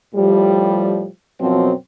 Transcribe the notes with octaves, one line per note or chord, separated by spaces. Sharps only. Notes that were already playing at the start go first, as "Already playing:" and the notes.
A2 F3 G3
F#2 B2 F3 F#3 C4